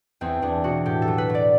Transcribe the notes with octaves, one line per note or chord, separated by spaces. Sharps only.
E2 C4
E2 D4
B2 F#4
A2 G4
A4
F#3
B4
F#3
D5